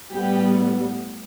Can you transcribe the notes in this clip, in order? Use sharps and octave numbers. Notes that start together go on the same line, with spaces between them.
A2 G3 B3 G4